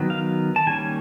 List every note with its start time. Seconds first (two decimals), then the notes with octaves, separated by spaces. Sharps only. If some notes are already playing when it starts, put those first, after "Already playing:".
Already playing: D#3 F#3 B3
0.10 F5
0.56 A5
0.66 D#3 G3 A#3 C#4 G#5